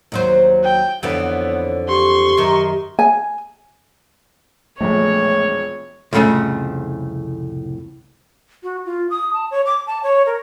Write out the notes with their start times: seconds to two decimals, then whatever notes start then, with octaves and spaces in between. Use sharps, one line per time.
0.12 D#2 F#3 C5
0.63 G5
1.03 F2 D3 E3 B3 C#5
1.88 G4 C6 C#6
2.37 F#2 D#3
2.99 G#5
4.81 E1 A#1 A3 C#5
6.13 C2 F2 A2 C#3 A3
8.63 F#4
8.86 F4
9.10 D#6
9.33 A5
9.51 C#5
9.66 D6
9.87 A5
10.03 C#5
10.26 A#4